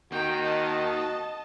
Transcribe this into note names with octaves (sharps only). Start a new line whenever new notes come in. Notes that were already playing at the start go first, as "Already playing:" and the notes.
D#3 A#3 D#4 F#4 G5
D#5 A5